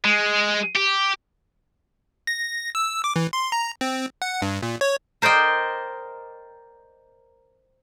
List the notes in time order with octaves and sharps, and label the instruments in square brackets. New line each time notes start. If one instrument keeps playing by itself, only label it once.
[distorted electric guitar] G#3
G4
[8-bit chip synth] A#6
E6
D6
E3
C6
A#5
C4
F#5
G2
A#2
C#5
[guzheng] A#4 C5 D5 D#5 G5